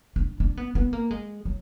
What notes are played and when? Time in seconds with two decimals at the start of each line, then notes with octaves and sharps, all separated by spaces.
0.16 D4
0.40 D4
0.57 B3
0.75 B3
0.93 A#3
1.11 G#3
1.45 F#3